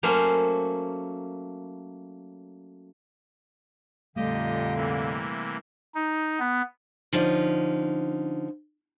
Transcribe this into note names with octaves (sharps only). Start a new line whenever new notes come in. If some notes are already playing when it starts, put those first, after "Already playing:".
F#3 A3 A#3 C#4 C5
F2 A#2 D3 G3 A3 G4 D#5 F5
C3 E3 A#3
D#4
B3
D3 F3 C#4 D#4